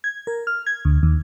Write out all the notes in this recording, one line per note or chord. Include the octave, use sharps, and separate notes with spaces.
G#6
A#4
F6
G#6
D2
D#2